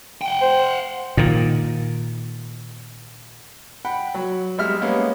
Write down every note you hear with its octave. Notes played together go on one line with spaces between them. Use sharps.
F#5 G5
C5
A#2 D#3
F#5 G5 B5
F#3
B1 G3 G#3 E5 F6
G3 G#3 A#3 B3 C#4